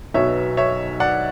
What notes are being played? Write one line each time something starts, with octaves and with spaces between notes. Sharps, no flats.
B1 B2 F#3 B3 C#5 E5
C#5 E5
D5 F#5